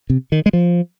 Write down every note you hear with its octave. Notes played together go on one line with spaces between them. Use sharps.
C3
D#3
G#3
F3